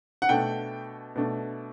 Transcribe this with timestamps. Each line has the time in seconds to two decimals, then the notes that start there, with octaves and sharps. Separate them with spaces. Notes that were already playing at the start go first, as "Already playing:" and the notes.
0.22 F#5
0.29 B2 A3 D4 G5
1.16 B2 A3 D4